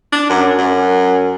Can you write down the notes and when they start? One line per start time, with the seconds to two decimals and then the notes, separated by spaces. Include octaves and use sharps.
0.13 D4
0.29 F#2
0.58 F#2